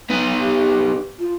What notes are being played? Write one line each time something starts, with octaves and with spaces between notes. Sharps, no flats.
B3 D#4
G4
F4